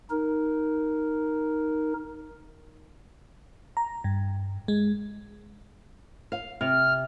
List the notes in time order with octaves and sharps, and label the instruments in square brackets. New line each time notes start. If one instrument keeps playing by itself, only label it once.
[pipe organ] D#4 A#4
[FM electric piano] A#5
G2
G#3
[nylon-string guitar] F5
[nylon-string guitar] C3 [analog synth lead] F6